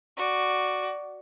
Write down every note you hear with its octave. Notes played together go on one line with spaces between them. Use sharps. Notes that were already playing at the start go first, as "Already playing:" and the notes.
F#4 D5